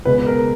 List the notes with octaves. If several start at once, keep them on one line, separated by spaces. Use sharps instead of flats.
C#2 B2 G#3 B4
A#4